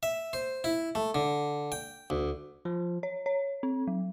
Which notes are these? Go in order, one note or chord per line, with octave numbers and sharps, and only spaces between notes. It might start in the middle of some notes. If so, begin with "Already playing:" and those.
E5
C5
E4
A3
D3
G5
D2
F3
C#5
C#5
C4
F#3